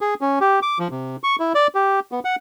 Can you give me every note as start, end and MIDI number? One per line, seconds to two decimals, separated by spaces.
0.01 0.14 68
0.21 0.39 61
0.41 0.60 67
0.62 0.78 86
0.79 0.88 53
0.91 1.16 48
1.23 1.36 85
1.40 1.53 64
1.55 1.67 74
1.75 2.00 67
2.12 2.20 59
2.25 2.36 78